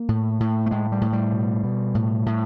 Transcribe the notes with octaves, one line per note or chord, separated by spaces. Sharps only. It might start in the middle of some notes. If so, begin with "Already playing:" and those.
Already playing: A#3
A2
A2
A3
A2 G#3
G3
A2
G3
B2
B2
A2
A2